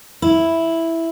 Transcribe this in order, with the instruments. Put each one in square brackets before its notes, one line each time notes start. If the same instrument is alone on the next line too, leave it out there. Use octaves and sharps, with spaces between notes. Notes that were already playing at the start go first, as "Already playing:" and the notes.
[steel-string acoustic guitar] E4